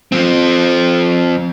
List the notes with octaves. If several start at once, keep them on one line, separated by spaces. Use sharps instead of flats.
F3 C4